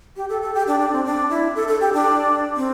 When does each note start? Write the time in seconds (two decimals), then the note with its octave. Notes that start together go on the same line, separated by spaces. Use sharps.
0.16 G4
0.29 A4
0.42 A4
0.54 G4
0.67 D4
0.80 D4
0.92 C4
1.05 D4
1.30 E4
1.55 A4
1.68 A4
1.81 G4
1.93 D4
2.56 C4